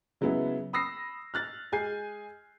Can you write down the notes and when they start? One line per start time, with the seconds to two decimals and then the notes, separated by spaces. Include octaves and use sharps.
0.21 C#3 F#3 G#3 B3 E4 G#4
0.73 B5 D#6 E6 A#6 C7
1.34 F6 F#6 A6
1.72 G#3 G#4 G#5 G6 C7